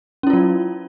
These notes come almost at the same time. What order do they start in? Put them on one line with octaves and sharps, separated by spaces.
C#4 E4 F4 F#3